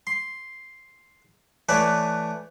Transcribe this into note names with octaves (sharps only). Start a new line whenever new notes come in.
C6
E3 A3 B4 C#5 D5 A5